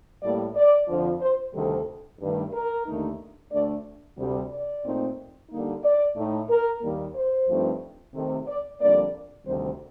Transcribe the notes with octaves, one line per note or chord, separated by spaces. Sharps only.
A2 G3 A#3 D5
D5
F2 D3 F3
C5
D2 C3 D#3 G3 C4 A4
G2 D#3 A3
A#4
D#2 D3 A3 D#4
D2 D3 A3 D4 D5
D2 C3 G3
D5
A#2 A3 C4 D#4
D3 G3 A#3 D#4
D5
A2 A3 D#4
A#4
D#2 D#3 G3 A#3
C5
G2 F3 A3 C4 D#4
C3 D#3 A3
D5
F2 D3 G3 A#3 D4 D5
D2 C3 D#3 G3 C4 C5